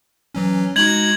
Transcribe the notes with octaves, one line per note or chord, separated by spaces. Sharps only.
E3 F#3 C#4
G#3 D#4 F#4 G#6 F#7